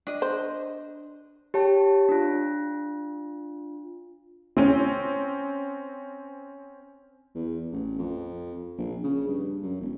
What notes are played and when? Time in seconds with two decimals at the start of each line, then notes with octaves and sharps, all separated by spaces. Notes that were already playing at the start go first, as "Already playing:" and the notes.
0.07 D4 D#5
0.22 C5
1.54 G4 C#5 A5
2.09 D4 F4
4.57 C4 C#4
7.35 E2
7.72 A1
7.98 F2
8.78 A#1
9.03 C#3
9.28 G2
9.63 F#2
9.81 E1